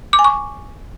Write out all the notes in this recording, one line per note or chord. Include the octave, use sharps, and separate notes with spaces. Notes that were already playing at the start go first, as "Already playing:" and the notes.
D6
G#5
C#6